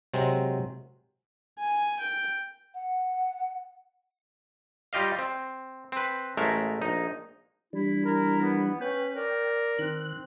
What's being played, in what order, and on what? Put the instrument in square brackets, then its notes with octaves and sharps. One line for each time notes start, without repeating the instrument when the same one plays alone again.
[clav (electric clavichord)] C3 F#3 G#3 C4
[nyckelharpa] G#5
G5
[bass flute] F#5
[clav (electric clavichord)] G3 F4 G4 D#5 F5
C4
C4 B4
A1 G#3 A3 A#4 E5
A#1 D#4
[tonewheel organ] E3 G3 D4 [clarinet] E4
[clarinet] E4 [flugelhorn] A#4
[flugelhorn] B3
[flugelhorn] C#4 [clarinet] B4 [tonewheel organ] G5
[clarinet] A#4 [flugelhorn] D5
[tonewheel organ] D#3 F#6 [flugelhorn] C4